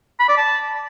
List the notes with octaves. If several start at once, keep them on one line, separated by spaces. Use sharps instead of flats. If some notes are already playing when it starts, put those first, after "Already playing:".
B5
D5
A5